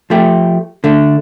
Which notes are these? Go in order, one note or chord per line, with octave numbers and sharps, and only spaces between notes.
F3 A3 G4
D3 A3 D4